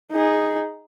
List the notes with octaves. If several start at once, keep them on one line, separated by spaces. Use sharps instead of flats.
D#4 G#4